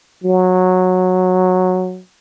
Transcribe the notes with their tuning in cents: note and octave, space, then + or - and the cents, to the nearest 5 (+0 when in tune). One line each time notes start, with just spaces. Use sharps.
F#3 -10